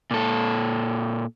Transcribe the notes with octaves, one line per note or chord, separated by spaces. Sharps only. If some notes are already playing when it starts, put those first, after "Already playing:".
A#2 A4